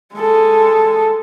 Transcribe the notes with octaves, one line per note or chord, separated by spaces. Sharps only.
G#3 A4